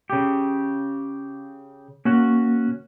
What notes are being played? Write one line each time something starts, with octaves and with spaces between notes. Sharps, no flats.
C#3 G4
A#3 C#4 F#4